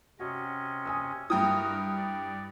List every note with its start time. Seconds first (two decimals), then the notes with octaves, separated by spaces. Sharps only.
0.19 C3 C#4 F#4 D#5
0.86 G#5 D#6 E6
1.30 G2 E4 F#4 A#4 G5 D#6
1.97 D5